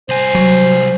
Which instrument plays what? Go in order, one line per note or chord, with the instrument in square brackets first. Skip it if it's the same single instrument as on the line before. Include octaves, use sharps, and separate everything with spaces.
[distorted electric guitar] C2 G#5 [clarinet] C5
[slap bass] F#3